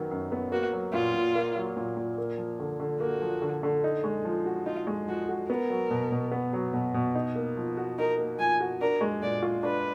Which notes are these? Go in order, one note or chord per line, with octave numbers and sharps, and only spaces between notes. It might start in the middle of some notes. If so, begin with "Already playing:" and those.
Already playing: F#2 D#3 F#3 B3
F#2
B3
A#3 F#4
F#3
A#2 F4
A#2
A#3
F#3
A#2
A#2
A#3
F3
D3
D3
A#3 F#4
F3
D3
D3
D#4
G#3
F3
F#4
D#4 F4
G#3
F3 F#4
F#4
B3 A#4
F#3
B2
B2
B3
F#3
B2
B2
D#4
A#3
F3
F#4
D#4 A#4
A#3
F3 G#5
F#4
D4 A#4
G#3
A#2 D5
F4
D4 B4